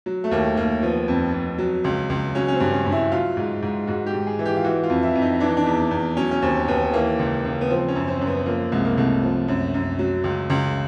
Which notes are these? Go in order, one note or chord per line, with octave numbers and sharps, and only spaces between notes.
F#3
A3
D#2 A#3
D#2 A#3
F3 B3
F2
F2
F#3
C#2
C#2
F#3 C#4
C#4
C4
G2
C#4
G2
E4
F#3 F4
G#2
G#2
G#2 F#4
G4
G#2
G#4
E3
G4
F4
E3 F#4
F4
F2
E4
F2
D#4
E3 D4
D#4
D4
E2
E2
F#3 C#4
C#4
D#2 C4
D#2 B3
E3 A#3
C#2
C#2
B3
F3 C4
C#4
F#2
C4
F#2
B3
F3 A#3
C2 G#3
A#3
C2 A3
F3
F#2
F#2
F#3
C#2
C#2